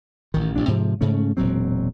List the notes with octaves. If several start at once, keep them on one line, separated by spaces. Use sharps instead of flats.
A1 D#3
A1 C3 D4
G#2 C3 E3 F3
G#2 C#3 A3 C#4
E1 A#2 F#3 C4